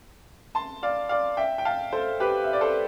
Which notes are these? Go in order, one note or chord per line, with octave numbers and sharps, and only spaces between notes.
A5 C6
D5 F5
D5 F5
E5 G5
G5
F5 A5
A4 C5
G4 B4
E5
D5
A4 C5